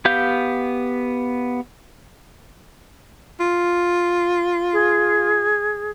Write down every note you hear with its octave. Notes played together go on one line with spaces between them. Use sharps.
B3 G4 F5 G6
F4
G#4